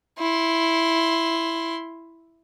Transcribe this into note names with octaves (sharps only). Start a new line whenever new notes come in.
E4 C6